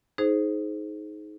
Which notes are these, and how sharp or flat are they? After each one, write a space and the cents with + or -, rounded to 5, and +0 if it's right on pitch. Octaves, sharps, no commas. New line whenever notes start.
D#4 +15 G#4 +25 C5 +0